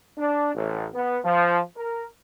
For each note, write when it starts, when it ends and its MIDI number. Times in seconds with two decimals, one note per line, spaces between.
0.18 0.51 62
0.55 0.87 33
0.95 1.19 59
1.24 1.59 53
1.76 2.04 70